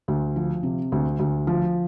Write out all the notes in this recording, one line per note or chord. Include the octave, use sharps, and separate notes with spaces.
D2
F3
C3
D2
D2
F3